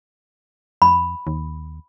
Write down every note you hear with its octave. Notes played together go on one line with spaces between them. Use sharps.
F2 B5
D#2